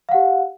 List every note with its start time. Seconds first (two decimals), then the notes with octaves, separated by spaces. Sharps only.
0.09 F5
0.11 F#5
0.14 G4